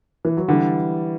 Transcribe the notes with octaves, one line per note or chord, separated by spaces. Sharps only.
E3
F#3
D3 E3 G3